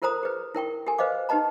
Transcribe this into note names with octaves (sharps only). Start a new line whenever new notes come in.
F4 A4 A#4 C5 A#5 D#6
G#4 B4
E4 A#4 G5 C#6
G4 A4 A#4 G#5
B4 C5 D#5 F5 D6
D#4 G4 B4 D#5 A5 A#5